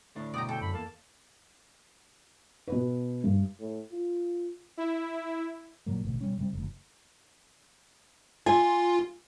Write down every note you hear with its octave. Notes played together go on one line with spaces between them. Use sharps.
D2 A2 D4
B2 D5 G5 A#5 D#6
A4 G5
F#2 B5
E2 A#3 A5
B2 B4
G2
A2
F4
E4
A1 A#2 F#3 A#3
A1 D2 B2
B2 G3 C#4
C3 G3 C4
F1 D2
F4 G#5